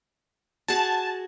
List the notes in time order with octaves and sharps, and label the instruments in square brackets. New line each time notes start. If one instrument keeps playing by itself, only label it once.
[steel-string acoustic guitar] F#4 G#4 [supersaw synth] A5